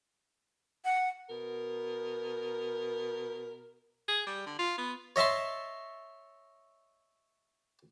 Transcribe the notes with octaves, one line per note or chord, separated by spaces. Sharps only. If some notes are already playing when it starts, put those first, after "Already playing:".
F#5
B2 A#4
G#4
G3
D3
F4
B3
C#5 D#5 E5 A5 C6